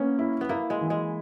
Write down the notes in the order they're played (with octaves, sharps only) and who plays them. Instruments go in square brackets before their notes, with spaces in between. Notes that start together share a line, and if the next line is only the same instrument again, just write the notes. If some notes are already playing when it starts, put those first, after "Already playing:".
Already playing: [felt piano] A#3 C#4 [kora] B3
[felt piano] E4
[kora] B3
[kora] A#3 [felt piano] E4
[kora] G#3
[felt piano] E3
[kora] G#3